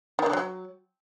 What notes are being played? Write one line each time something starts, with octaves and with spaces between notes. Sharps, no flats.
D#3
D3
F#3